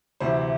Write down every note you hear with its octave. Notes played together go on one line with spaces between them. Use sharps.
D2 C3 E3 C5